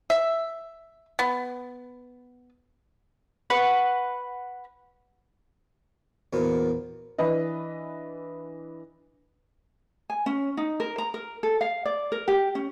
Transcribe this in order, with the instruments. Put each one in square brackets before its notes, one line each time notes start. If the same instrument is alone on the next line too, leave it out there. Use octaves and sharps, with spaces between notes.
[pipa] E5
B3
[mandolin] B4 F#5 C#6
[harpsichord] E2 A#2 B3 [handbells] F#4 A#4 C5
[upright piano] E3 D4 B4 D#5
[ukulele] G#5
C#4
D#4
A#4
A#5
A#4
A4
F5
D5
A#4
G4
C#4